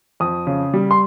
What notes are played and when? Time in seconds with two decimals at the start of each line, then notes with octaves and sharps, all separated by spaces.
0.20 F2 D#6
0.47 C#3
0.74 G3
0.91 C6